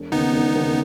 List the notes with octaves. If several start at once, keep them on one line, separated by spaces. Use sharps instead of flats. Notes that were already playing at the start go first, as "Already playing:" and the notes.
Already playing: E1
D#2 C#3 B3 D#4
E1
D#2 C#3